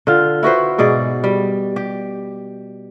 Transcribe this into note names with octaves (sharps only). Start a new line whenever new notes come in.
D3 F4
E4 F#4 B4 C5
G#2 B2 G#4 D5
G3
G4